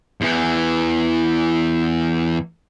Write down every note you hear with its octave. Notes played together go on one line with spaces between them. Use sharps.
E2 E3